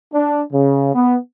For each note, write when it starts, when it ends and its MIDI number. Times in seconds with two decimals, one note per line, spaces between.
0.13 0.42 62
0.52 0.93 49
0.94 1.17 59